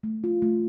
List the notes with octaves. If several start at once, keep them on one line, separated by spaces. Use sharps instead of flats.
A3
F4
A3